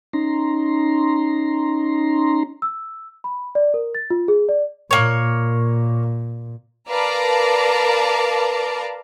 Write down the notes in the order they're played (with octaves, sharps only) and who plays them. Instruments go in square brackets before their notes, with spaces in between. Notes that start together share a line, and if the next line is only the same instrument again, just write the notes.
[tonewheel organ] C#4 D#4 A#5 C6
[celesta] E6
B5
D5
A#4
A6
F4
G#4
D5
[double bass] A#2 [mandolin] A#3 C#5
[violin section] A#4 B4 D5 F5 A5 A#5